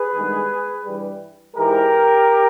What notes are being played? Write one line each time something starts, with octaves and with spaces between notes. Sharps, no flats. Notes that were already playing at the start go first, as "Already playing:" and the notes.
Already playing: G#4 B4
G2 D#3 G#3 B3
G2 E3 G3
G#2 E3 G#3 G4 A#4